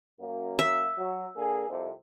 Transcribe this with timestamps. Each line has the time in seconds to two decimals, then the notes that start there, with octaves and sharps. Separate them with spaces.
0.20 F#2 A#3
0.59 E5
0.98 F#3
1.37 D3 A#3 G#4
1.69 C2 F2 C3